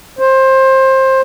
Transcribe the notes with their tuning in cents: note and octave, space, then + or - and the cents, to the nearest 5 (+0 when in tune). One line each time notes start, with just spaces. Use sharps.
C5 +20